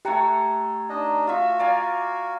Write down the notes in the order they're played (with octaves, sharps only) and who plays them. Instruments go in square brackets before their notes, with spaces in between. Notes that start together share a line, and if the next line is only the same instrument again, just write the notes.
[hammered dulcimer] A3 C#5 F#5 [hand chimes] G4 G5 A#5
[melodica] D4 D#4 D#5
[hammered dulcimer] F4 E5 [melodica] F#4
[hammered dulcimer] D5 F5 G#5 [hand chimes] A#5